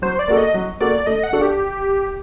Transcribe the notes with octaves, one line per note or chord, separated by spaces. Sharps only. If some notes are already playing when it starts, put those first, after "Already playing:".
F#3 C5
D5
A#3 F#4 A4
D#5
F#3
A#3 F#4 A4 D5
A3 D#5
F#5
D4 F#4 A4
G4